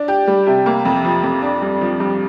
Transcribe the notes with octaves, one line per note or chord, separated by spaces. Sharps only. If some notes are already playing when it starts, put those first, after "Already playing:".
Already playing: D4
G4
G3
C3
A#3
F2
F3
F2
D4
G2
F3
G2